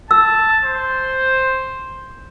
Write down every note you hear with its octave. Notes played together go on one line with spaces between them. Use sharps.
A5 E6
C5